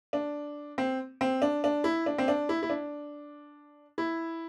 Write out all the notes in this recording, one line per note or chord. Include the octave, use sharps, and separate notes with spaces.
D4
C4
C4
D4
D4
E4
D4
C4
D4
E4
E4
D4
E4